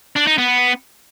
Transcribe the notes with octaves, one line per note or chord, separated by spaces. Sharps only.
D4
D#4
B3